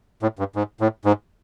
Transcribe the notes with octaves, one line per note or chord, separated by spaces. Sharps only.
A2
G2
G#2
A2
G#2